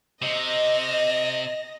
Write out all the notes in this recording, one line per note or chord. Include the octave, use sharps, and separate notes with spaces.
C3 D#5 A#6